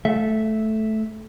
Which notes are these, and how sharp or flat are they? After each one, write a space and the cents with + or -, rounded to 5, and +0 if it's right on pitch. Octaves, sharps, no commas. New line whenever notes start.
A3 -10 E5 +0